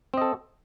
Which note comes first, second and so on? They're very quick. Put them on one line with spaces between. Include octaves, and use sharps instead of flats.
C4 D#5 A4